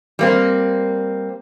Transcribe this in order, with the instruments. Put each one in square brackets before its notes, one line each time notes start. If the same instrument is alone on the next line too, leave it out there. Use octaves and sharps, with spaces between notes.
[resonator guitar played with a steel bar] G3 A#3 C4